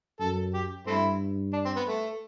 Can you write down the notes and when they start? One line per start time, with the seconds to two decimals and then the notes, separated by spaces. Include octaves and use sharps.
0.20 F#2 A4
0.54 G4
0.87 G2 A3 C4 E4
1.53 D4
1.65 C4
1.76 B3
1.87 A3